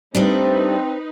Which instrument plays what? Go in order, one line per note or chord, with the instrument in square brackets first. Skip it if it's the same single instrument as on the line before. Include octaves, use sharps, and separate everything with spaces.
[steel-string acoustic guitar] G3 A3 D4 [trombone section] C4 [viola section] D#4 B4